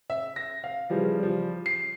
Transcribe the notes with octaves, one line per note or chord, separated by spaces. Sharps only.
E5
A#6
F5
C#3 E3 F3 G3
F3 G3
C7